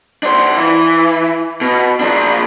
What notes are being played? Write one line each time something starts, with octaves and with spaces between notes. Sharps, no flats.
D4 C5
E3
B2
F3 D4